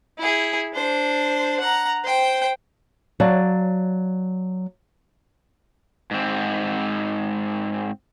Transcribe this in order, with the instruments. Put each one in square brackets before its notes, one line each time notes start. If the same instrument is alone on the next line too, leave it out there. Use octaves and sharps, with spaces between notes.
[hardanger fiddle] E4 G#4
D4 C5
F#5 A#5
C5 G5
[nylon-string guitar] F#3 D5 F5 A5
[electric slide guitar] G#2 C4